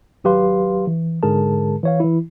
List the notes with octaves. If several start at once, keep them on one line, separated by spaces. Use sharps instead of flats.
G#1 F#3 G4 B4 F5 C6
E3
G#2 D3 G#3 G#4 A#4 A5
E3 C#5 F5
E3 E4